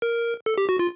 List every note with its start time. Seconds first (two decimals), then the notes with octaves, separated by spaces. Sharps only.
0.02 A#4
0.46 A4
0.58 G4
0.69 F#4
0.79 F4